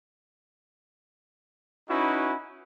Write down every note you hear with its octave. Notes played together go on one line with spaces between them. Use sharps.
C#4 D#4 E4 F#4 B4